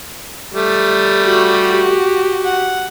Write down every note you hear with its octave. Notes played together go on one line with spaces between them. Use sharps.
G3 A3
F#4 G4
F#5